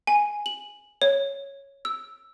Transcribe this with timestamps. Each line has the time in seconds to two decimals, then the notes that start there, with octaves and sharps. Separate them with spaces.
0.07 G#5
0.46 F#7
1.02 C#5
1.85 E6